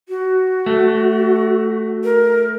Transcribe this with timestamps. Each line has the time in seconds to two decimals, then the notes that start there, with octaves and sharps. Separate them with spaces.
0.09 F#4
0.66 A3
2.04 A#4